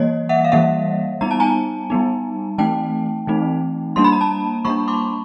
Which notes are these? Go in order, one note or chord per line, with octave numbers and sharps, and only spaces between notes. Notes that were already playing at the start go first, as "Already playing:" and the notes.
Already playing: E3 G3 A#3 C#5 D#5
E5 F#5
F5
E3 G3 A#3 E5 F#5
G3 B3 D#4 A#5
A5
G#5 A#5
G3 B3 D#4
E3 A3 C4 D#4 G5 A5
E3 A3 C4 D#4
G3 A#3 D4 C6
B5
A#5
A5 B5
G3 A#3 D4 B5 C#6
C6 D6